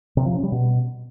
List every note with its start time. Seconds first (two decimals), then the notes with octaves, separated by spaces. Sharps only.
0.17 C3
0.26 F3
0.34 C#4
0.43 G3
0.52 B2